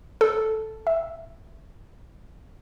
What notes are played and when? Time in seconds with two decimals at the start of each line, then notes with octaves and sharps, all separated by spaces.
0.21 A4
0.87 E5